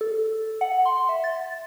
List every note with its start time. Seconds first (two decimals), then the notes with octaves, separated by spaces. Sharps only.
0.01 A4
0.61 F#5
0.86 C6
1.09 E5
1.24 A6